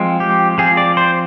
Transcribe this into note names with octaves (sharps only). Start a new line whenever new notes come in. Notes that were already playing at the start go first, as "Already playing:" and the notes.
Already playing: F3 G#3 C4
G4
F3 C4 G#4
D5
C5